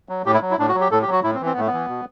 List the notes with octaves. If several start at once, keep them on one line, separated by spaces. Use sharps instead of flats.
F#3
A2 G4
E4
F#3
E4
A2 D4
F#4
F#3
G4
A2 A4
G4
F#3 F#4
A2 E4
C4
E3
C4
B3
A2 A3
B3
E3
B2